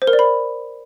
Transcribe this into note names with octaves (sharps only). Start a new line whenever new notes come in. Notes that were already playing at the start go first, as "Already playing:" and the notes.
C5
A#4
D5
B5